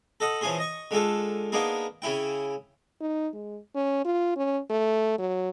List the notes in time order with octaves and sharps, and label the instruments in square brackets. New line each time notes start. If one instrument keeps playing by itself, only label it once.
[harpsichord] A4 D#5 F#5
E3 F3 C#4 G#4 C6
D#5 C#6
D3 G#3 F4 A4
A#3 B3 D4 D#4 G#4
C#3 C#4 E4 G5
[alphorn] D#4
G#3
C#4
F4
C#4
A3
F#3